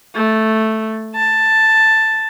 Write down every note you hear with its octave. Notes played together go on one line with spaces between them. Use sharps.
A3
A5